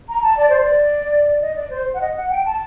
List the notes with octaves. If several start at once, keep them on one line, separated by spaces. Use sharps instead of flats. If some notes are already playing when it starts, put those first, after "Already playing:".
A#5
A5
D5
C5
D5
D#5
D5
C5
F#5
D#5
F#5
G5
A5